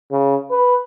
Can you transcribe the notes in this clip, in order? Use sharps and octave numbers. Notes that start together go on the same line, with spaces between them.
C#3
B4